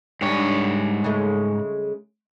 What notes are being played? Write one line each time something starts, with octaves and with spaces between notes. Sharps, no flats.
G#2 G3 D4 C#5
C#3 G#3 A3